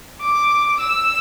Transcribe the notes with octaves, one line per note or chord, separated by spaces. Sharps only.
D6
E6